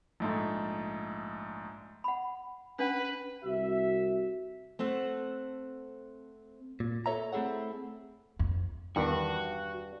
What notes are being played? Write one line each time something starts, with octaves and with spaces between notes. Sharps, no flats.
A#1 G#2 A3
F#5 B5
C#4 D4 B4 F#5
C2 F#4 E5
A3 C4 A4 F#5
A#2
A4 B4 C#5 E5 A#5
A3 C4 E4 G#4 A4 F#5
F2
E2 G2 D#3 F#4